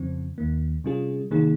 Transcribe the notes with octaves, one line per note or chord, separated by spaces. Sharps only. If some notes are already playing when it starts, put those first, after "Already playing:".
Already playing: F2 C#3 F3 C4
D#2 D#3 A#3
C3 G3 C#4 F4 G#4
C3 D#3 A#3 D#4 G#4